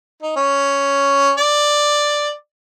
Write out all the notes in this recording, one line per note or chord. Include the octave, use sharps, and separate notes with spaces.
D#4
C#4
D5